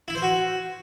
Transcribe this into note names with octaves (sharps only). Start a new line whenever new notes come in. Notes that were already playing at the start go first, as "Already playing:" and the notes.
E4
C5
F#4